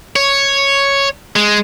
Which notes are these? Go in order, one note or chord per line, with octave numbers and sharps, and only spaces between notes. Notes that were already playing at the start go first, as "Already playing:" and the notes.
C#5
G#3